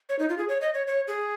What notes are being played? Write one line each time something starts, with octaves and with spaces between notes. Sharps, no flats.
C#5
D#4
F4
G#4
C#5
D#5
C#5
C#5
G#4